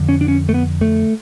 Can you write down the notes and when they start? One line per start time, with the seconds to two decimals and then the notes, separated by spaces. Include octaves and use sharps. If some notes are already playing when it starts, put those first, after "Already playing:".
Already playing: F2 D3
0.09 C#4
0.21 D4
0.28 C#4
0.49 A3
0.54 B3
0.81 A3